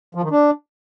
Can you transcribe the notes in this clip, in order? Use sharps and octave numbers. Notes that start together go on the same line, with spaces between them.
F3
D#3
D4